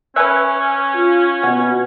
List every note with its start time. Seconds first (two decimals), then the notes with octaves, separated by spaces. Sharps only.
0.16 C#4 B4 E5 G#5 F#6
0.95 F4
1.43 B2 F#5